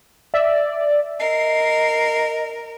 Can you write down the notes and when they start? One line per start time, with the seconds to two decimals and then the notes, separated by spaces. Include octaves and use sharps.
0.34 D5 E5
1.20 A#4 D#5 C7